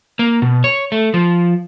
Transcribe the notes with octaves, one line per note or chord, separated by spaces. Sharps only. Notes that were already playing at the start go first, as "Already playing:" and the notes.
A#3
B2
C#5
A3
F3